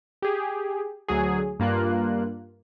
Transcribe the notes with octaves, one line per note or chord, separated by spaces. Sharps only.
G4 G#4
D2 F#3 G#4
G2 A#3 F4 F#6